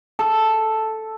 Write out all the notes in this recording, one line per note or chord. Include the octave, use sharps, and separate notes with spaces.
A4